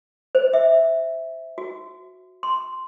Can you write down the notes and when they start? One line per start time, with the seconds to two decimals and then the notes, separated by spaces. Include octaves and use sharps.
0.35 C5
0.53 E5
1.58 F#4
2.43 C6